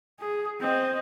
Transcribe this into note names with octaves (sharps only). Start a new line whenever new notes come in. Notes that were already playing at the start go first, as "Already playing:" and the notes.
G#4
C4 D#5